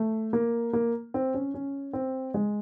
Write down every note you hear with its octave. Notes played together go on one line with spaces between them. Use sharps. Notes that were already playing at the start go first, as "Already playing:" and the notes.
Already playing: A3
A#3
A#3
C4
C#4
C#4
C4
G#3